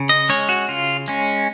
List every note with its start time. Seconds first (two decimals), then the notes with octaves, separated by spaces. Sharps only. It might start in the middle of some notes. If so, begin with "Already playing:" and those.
Already playing: C#3
0.09 D#5
0.29 G#3 C#4 C#5
0.49 F#4
0.68 C#3 F4
1.08 G#3 C#4